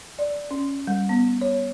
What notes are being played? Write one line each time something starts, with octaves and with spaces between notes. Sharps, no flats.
D5
C#4
G3
B3
C#5